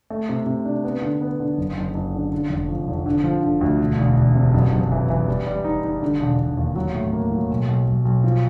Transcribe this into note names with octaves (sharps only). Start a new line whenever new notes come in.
A3
C3
C3
D4
B3
D3
B3
D3
F#1
F#1
F#1
D3
D3
F1
F3
F1
D3
F3
D3
D2
E1
E1
E1
C3
F#1
F#1
E3
E3
G3
G3
D#4
D#4
D3
E1
E1
D#2
F#3
A2
A#3
F#3
B1
B1
B1
B1
F3